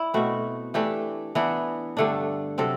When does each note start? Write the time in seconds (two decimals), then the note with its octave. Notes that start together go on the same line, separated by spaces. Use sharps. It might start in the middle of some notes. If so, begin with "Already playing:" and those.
Already playing: E4 D5
0.14 B2 A3 C4 F#4
0.74 E3 A3 D4 G4
1.35 E3 B3 D4
1.97 G2 D3 A3 D4
2.58 C3 F#3 C4 A4